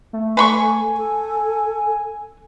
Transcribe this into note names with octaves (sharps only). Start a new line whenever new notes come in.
A3
A3 B4 G#5 B5 C#6
A4